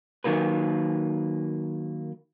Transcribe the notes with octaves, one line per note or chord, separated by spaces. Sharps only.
D#3 F#3 A#3 B4